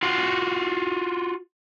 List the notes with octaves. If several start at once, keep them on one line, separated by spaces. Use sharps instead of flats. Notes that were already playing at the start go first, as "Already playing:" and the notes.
F4 F#4 F5